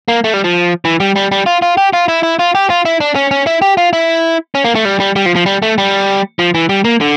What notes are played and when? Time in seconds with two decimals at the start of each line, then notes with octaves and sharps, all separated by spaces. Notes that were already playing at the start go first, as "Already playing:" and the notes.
0.08 A#3
0.24 A3
0.34 G3
0.44 F3
0.85 E3
1.00 G3
1.16 G3
1.31 G3
1.46 F4
1.62 F4
1.77 G4
1.93 F4
2.08 E4
2.23 E4
2.39 F4
2.55 G4
2.70 F4
2.85 E4
3.00 D4
3.15 C#4
3.31 C#4
3.47 E4
3.62 G4
3.77 F4
3.93 E4
4.55 C#4
4.65 A#3
4.75 A3
4.85 G3
5.00 G3
5.16 G3
5.26 F3
5.36 F3
5.46 G3
5.62 A3
5.78 G3
6.39 F3
6.54 E3
6.69 G3
6.85 A#3
7.01 D3